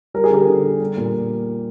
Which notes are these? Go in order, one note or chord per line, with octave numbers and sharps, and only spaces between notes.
G3 A#4
G#4
D3 G4 A#4
D3
G3
G3
A#2